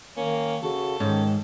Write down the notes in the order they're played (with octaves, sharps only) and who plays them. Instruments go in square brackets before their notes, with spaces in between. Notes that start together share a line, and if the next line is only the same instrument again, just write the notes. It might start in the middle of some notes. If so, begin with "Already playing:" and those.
[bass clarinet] D#3 [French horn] A#3 [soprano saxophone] C#4
[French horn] C#3 [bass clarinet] F#4 [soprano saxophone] A4
[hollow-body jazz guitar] G#2 [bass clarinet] D#3 [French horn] C#4